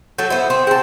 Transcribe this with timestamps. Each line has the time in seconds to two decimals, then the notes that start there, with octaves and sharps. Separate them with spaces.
0.18 F#3 A4 G6
0.30 B3 E4 C5
0.50 C4
0.67 C4 G#4 A5 G6